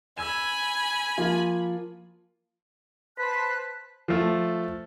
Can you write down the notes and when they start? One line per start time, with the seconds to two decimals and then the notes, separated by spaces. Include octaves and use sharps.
0.18 G#5 B5 E6 G#6 E7
1.18 F3 A#3 F4
3.18 B4 C5 A5 F#6 B6
4.08 F3 A3